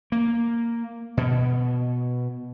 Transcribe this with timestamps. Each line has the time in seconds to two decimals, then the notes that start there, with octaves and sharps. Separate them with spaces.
0.12 A#3
1.17 B2